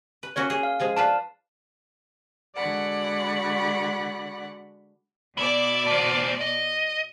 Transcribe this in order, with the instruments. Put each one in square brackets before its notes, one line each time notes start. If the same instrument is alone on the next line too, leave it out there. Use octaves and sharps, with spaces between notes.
[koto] B4
[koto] A#3 C#4 F#4 [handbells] C#5
[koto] G#4
[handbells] F5
[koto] F3 G#3 G#4
[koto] D4 F4 B4 [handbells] F5 A5
[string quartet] D3 G#3 F#4 D5 F#5 B5
[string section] B2 D5 [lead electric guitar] E4 E5
[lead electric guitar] A3 C5
D#5